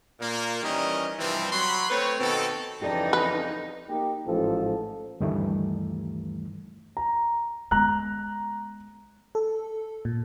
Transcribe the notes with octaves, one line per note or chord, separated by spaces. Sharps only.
A#2 A#3
D#3 E3 G3 C#4 A#4 D#5
G2 C3 E3 F3 G3 C4
F#3 B5 C6
A3 C4 B4 C#5
B2 D#3 C4 A4
F2 C#3 E3 D#4 G4 A4 D5
B4
A#3 D#4 G4
A1 G#2 F3 A4
D2 G2 D#3 E3 G3 A3
A#5
G#3 B3 A#5 F#6
A4
A#2